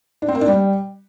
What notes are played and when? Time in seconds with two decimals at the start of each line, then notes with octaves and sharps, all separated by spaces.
0.22 D4
0.28 C4
0.35 A#3
0.41 D4
0.48 G3